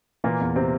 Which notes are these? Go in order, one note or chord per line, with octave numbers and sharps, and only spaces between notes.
A#2 E3 A#3
E2
C3 C4